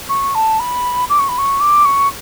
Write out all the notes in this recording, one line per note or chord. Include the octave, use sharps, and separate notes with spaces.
C#6
A5
B5
D6
C#6
B5
C#6
D6
C#6